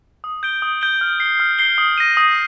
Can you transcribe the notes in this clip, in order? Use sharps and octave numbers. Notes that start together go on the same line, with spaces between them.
D#6
G6 D7 G7
D#6
G6 D7 G7
F6
C7 G7
F6
C7 G7
D#6
A#6 D#7
D#6